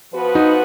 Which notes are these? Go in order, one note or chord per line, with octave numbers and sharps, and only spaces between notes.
F3 B3 F#4 B4
D#4